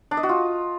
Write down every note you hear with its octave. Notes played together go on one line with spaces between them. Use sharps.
D4
D#5
F#4
F4